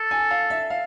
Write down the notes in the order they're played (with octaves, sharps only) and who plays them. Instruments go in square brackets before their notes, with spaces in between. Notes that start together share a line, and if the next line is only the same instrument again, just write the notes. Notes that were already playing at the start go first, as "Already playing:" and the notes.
Already playing: [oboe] A4
[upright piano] G#5
F5
E5
F5